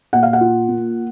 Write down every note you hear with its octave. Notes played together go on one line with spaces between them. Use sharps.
A#2 F#5
F5
F#5
F4
A#3